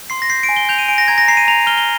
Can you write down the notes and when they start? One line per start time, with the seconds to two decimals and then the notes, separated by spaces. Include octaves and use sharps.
0.10 C6 C7
0.22 A#6
0.30 G6 C7
0.43 D7
0.49 G#5
0.56 G7
0.69 G6 F7
0.78 D#7
0.88 G#5 D7
0.98 A#6
1.08 A#5 G#6
1.18 A#6
1.28 A#5 C7
1.37 D#7
1.48 A#5 F7
1.67 F6 G7
1.78 G7